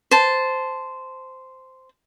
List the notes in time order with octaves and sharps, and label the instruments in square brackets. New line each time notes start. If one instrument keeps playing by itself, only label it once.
[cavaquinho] C5 A5